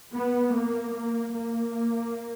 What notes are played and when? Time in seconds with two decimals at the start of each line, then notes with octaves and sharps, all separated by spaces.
0.12 B3
0.53 A#3
0.94 A#3
1.34 A#3